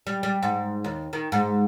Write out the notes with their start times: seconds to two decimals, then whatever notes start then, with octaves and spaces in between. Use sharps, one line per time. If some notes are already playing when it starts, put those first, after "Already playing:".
0.07 G3
0.23 G3
0.43 G#2
0.84 D#2
1.13 D#3
1.32 G#2